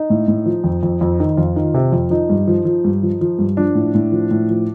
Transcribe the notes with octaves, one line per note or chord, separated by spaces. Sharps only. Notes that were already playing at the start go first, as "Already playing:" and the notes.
Already playing: D#4
A2
A2
F3
F2
F2
F2
D#3
F2 F4
D#3
C3
F2
F3 D#4
G2
F3
F3
G2
F3
F3
G2
F3 D4
A2
A2
F3
A2
F3